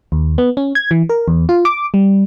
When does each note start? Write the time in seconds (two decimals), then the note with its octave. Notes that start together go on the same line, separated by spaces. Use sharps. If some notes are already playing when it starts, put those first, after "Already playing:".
0.12 D#2
0.38 B3
0.57 C#4
0.75 G#6
0.91 E3
1.09 A#4
1.28 E2
1.49 F4
1.65 D6
1.94 G3